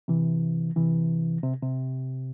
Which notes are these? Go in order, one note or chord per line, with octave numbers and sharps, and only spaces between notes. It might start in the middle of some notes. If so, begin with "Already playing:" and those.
C3 E3
C3 E3
C3
C3